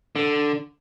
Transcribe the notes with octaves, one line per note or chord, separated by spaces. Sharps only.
D3